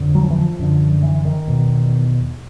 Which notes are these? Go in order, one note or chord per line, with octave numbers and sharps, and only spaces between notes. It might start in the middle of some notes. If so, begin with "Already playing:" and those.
Already playing: F2 D3
F#3
F3
E3
F3
F#2 D3
E3
D#3
E2 B2